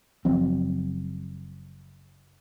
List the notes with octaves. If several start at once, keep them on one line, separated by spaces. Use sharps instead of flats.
F#1 F3 F#3 C4